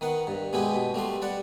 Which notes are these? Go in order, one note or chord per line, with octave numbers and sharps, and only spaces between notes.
D#3 B3 F#5
G2
B2 G#3 B3 E4 G4
B2
G3 A3 B3 C6
G3 D5 F#5